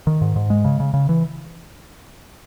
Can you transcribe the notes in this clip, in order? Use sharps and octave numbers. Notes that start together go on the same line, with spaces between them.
D#3
G#2
G#2
G#3
C#3
C#3
C#3
E3